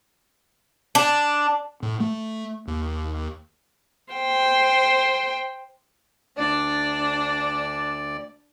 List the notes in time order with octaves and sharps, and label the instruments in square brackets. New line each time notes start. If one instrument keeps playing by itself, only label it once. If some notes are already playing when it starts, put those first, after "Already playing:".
[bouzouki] D4
[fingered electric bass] A2
A3
D#2
[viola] C5 G5
[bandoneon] D2 D5 [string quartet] D4